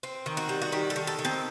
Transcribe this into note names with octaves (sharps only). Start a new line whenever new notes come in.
C4
D#3
F#4
G3
F#4
D#3 G4
A4
D#3
A4
D#3
C4